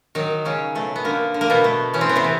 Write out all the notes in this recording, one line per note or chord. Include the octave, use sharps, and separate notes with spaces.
D#3 F#3 D#4
C#3 F#3 C#4
B2 A3
B3
D3 A#3
D3
A#3
B2 B3
A3
E3 C#4
C4
B3
C3 C4
E3